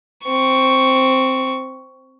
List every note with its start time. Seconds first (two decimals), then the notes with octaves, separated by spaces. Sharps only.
0.25 C4 C#6